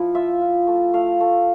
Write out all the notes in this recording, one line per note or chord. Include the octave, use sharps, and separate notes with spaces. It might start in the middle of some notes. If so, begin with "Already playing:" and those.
Already playing: F3 E4
F4 E5
F4
A3
A3 F5
A3